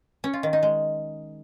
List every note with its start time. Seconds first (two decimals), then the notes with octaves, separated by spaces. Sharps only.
0.24 C#4
0.33 F4
0.43 D#3
0.53 D#4
0.63 G#3